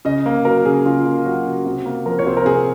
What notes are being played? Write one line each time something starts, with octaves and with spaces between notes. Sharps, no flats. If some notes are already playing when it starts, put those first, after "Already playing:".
C#3 D#5
A#3
F#3 A#4
C#3 G#4
C#3 F4
A#3
F#3 F#4
C#3
C3
A#3
F3 A#4
C#5
C3 C5
A#4
C3 G#4